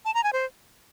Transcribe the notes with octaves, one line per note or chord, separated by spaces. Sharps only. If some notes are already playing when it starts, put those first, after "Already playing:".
A5
A#5
G#5
C5